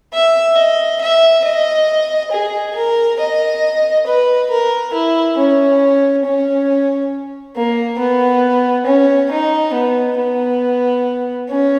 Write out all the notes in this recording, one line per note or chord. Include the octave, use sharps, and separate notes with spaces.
E5
D#5
E5
D#5
G#4
A#4
D#5
B4
A#4
E4
C#4
C#4
A#3
B3
C#4
D#4
B3
B3
C#4